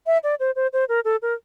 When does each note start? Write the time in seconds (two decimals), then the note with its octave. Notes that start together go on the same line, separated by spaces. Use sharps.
0.06 E5
0.23 D5
0.40 C5
0.56 C5
0.73 C5
0.89 A#4
1.05 A4
1.22 A#4